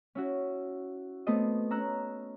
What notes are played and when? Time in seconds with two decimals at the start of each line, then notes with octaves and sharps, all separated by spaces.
0.15 C#4 E4 F#4
1.27 A3 B3 C4 D#5
1.71 C#4 A#5 E6 F#6